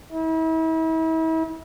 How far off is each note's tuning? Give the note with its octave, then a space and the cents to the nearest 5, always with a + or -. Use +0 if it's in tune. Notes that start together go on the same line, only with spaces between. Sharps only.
E4 -40